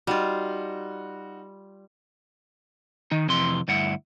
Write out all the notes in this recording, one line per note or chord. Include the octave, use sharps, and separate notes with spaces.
G3 D#4 F4 F#4
D#3 D#4
F2 C3 E3 C6
D2 G2 E4 F#5